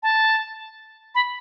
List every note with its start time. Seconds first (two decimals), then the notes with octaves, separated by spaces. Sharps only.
0.03 A5
1.15 B5